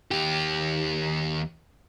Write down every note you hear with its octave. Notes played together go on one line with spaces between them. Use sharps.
D#2 G4